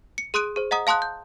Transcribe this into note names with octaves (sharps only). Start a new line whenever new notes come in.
C#7
G#4 C6 D#6 F#6 D7 D#7
G#4 C5
D#5 F#5 A#5 D#6
F5 A5 C6 D#6 F#6
G6